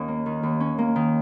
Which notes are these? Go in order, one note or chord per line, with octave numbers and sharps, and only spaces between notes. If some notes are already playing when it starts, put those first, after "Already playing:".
Already playing: D#2 C#4
A#3
D#3
D#2
C#4
A#3
D#3